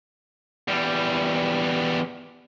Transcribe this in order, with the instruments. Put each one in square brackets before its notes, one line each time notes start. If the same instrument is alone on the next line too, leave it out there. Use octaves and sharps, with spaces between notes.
[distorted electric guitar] E2 G3